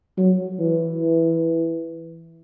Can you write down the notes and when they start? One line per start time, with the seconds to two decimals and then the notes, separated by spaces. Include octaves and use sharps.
0.18 F#3
0.60 E3